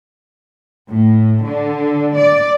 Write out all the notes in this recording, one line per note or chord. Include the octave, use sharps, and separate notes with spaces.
A2
D3
D5